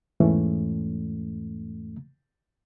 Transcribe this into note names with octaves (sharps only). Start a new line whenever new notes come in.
E2 G#2 E3 A3 C#4